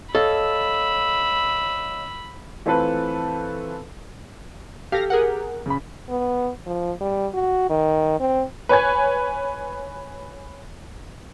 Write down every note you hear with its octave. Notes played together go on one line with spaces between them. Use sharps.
A4 C#5 D#5 F5 B5 E6
E3 A3 C4 F4 A4 B4
G4 A4 F5 A#6
G#4 A#4 F#5
C#3 B5
B3
F3
G3
F#4
D#3
C4
B4 C#5 G#5 G#6